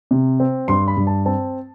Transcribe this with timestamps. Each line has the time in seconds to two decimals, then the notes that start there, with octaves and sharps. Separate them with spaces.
0.11 C3
0.40 C4
0.68 G2 C6
0.88 B5
0.97 G2
1.07 A5
1.26 C4 A5